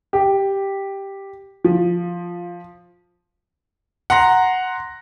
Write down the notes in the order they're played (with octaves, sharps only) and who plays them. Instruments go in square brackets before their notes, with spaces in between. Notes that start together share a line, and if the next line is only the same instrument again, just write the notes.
[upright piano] G4
F3
[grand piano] F#5 A#5 C6 A#6